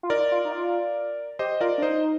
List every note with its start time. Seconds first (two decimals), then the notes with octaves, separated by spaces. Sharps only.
0.03 F4
0.10 D#4 A#4 D5
0.32 F4
0.45 D#4
0.52 F4
1.39 G4 C5 D#5
1.61 F4 A#4 D5
1.78 D4
1.82 D#4 C5 D#5